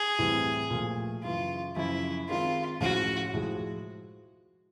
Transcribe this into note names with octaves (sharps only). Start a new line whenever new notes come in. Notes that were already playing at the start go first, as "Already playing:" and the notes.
Already playing: G#4
A2 E3 G3 C4
A#2 F3 A3
F#2 C#3 E3 F4
F#2 C#3 F3 E4
D#3 G#3 C4 D#4 F4
A2 F3 G#3 C#4 F#4
A2 F3 G#3